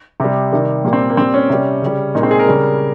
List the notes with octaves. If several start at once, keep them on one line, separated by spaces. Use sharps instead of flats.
C3 G3
C3 D#3 G3
A#2 G3 A#3
C4
A#3
A#2 G3 C4
C#4
C3 G3
C#3 G3
A#2 G#3 C4 D#4
G#4
A#4
C#3 G3